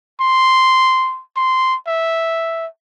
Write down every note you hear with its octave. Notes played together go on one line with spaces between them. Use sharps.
C6
C6
E5